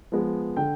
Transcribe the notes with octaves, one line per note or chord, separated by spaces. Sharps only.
F3 G#3 B3
D3 G5